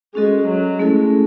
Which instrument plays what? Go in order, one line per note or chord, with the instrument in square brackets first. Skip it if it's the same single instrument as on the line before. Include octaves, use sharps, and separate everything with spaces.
[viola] G#3 [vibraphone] C#4 F#4 A4 D#5
[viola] F#3
[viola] G#3 [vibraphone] A3 C#4 E4 A4